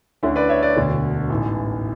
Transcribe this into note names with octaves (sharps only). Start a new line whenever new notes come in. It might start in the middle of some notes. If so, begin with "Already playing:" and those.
D2 D3 C#4 E4
B4 D5
C#5 E5
B4 D5
E1 D2 D3
A1 G#2 E3